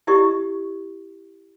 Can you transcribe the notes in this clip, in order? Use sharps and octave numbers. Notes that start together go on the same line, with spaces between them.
E4 G4 A#4 D5 D#5 C#6